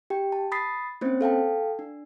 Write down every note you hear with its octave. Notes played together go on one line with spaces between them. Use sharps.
G4 G5
A5
B5 D#6 A6 B6 C7
A#3 C4 C#4 C5
A4 F5 G5 A5
D4